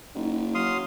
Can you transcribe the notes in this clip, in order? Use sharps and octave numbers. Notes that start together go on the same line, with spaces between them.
F#1 D#4
F#3 F5 C6 D#6